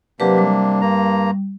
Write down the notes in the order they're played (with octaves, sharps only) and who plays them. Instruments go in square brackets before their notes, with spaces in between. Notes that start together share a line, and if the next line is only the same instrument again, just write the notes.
[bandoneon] C3 A#3 D4 [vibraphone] F#3 G4 B4
[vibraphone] G3
[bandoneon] G2 A#3 A#5